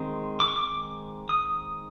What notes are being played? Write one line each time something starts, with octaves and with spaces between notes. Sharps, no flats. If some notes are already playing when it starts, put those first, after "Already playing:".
Already playing: D#3 G#3 C4
D6
C#6
D6
D#6